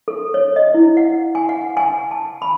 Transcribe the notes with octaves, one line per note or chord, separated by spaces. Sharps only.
A4
C#5
D#5
E4
F#5
G#5
F#5
G#5
A5
B5